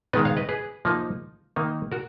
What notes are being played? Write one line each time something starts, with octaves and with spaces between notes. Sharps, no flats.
D#3 G#3 B3 D#4 B4 D#5
C#5 F5
B4 D#5
G#4 B4
F3 A#3 D#4
D#3 A#3 D#4
F#4 A#4